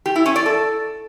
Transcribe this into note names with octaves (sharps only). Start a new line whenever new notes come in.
G4
E4
C#4
D5
A4